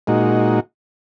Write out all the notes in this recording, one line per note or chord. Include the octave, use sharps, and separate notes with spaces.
A#2 G#3 D#4 F#4